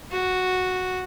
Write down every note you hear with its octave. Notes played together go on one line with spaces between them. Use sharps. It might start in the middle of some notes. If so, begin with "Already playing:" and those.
F#4